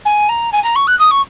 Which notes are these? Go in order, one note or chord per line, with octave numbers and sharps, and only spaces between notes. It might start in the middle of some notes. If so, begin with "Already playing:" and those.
G#5
A#5
G#5
A#5
C#6
F#6
D#6
C#6